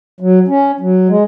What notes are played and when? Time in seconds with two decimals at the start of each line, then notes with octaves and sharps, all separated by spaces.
0.21 F#3
0.48 C#4
0.80 F#3
1.09 G#3